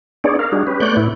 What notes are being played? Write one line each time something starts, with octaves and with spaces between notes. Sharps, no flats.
B3 D4 D#4 G#4 C#5 D5
A#4 F5
G3 D4 D#4 F#4 G#4
C#4 G4 B4
A3 B3 C#5 D5 F#6 G6
A2 B3 E4